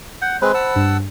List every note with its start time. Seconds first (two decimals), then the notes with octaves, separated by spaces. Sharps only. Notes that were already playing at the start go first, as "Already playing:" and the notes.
0.22 F#5 G6
0.42 G#3 C4 B4 C5 B5
0.54 F#5 A5 E6
0.76 G2